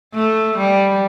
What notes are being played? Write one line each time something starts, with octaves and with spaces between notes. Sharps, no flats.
A3
G3